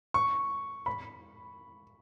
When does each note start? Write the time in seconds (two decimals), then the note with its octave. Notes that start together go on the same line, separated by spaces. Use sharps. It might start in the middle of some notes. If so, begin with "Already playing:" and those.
0.14 C#6
0.86 B5